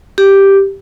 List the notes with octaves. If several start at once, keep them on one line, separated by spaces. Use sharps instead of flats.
G4